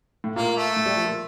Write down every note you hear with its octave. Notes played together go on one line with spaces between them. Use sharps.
A2
A#2 A#3
A3
A2
G3
F3
A#2